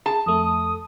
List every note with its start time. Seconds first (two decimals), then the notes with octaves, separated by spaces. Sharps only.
0.06 G#4 A5
0.26 F2 A3 D#6
0.45 D#6